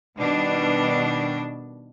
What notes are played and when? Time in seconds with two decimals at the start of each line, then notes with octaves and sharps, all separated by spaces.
0.18 B2 D#3 G3 D4